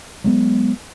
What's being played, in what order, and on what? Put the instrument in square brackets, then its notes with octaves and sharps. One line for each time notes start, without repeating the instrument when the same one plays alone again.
[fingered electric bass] F#3 G#3 B3